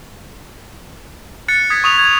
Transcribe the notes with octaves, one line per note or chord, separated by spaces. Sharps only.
F#6 A6 C#7
D#6 G#6 B6
C#6 D#6 F7
G#6